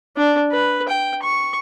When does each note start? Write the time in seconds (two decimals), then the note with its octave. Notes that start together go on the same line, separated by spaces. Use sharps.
0.17 D4
0.52 B4
0.88 G5
1.22 C#6